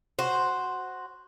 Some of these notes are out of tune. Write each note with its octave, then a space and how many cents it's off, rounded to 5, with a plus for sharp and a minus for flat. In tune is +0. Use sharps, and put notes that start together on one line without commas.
F#4 +0 C5 +0